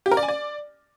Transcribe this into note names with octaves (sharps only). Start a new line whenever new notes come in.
G4
A#4
D5
G#5
D5